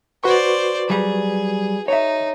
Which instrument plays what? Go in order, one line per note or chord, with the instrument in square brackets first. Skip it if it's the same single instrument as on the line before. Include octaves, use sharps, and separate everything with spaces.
[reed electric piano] F#4 B4 C#6 [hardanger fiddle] C5 D5
[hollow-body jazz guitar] F#3 G3 [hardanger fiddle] G#4
[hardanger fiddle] D#4 [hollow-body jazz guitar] C#5 E5